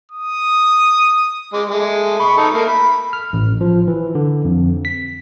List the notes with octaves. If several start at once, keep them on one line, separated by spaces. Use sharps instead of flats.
D#6
G#3 D6
G#3 A3
B5 C#6
D#4 A4 D#5
A3 A#3
B5
F6
A1
F3
E3
D3
F2
B6